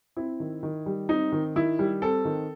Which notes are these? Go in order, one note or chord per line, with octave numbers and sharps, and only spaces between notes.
C4 E4
D#3
D#3
G3
C4 D#4
D#3
D#3 E4
G3
C4 A4
D#3